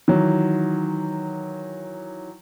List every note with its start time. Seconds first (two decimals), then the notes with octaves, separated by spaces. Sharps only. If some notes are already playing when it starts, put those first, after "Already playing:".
0.08 D#3 E3 F#3